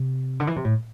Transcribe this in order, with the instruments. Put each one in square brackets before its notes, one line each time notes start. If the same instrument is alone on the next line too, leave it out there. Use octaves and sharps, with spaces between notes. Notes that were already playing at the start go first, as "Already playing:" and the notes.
Already playing: [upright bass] C3
D3
E3
C3
A2